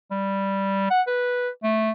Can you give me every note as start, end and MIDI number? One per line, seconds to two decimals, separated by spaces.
0.11 0.87 55
0.90 1.02 78
1.07 1.49 71
1.63 1.91 57